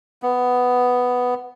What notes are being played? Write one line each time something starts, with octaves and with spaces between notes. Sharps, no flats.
B3